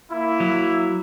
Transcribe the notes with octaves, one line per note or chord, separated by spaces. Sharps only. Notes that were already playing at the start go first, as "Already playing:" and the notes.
A#3 E4
F#3